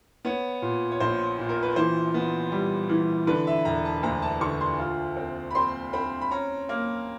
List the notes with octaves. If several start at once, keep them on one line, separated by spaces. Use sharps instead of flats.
B3 C#5
A#2
C#5
A#1 C5
A#2
A#4
B4
E3 C5
B3
G3
E3
D3 B4
E5
E1 A#5
A5
D2 A#5
A5
D3 C#6
C6
F4
C4
B5
C4 C6
C4 B5
B5
C#4 A#5
A#3